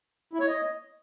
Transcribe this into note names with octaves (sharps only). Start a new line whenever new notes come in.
E4
C#5
D#5